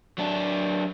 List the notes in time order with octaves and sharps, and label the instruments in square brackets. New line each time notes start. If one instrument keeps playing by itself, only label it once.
[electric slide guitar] F#3 D4